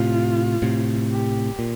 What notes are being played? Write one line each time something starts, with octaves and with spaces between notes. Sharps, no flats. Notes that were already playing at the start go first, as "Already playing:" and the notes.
Already playing: A2 C3 F4
A2 C3
G4
A#2